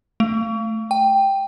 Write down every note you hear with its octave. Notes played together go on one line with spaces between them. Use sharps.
A3
G5